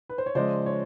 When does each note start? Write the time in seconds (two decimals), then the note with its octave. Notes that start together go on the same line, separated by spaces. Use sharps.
0.09 B4
0.18 C5
0.26 C#5
0.35 C#3 F3 G#3 C5 D5
0.66 C#5